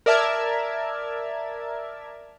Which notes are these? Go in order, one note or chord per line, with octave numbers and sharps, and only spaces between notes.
A#4 D5 E5 A5 F6 G#6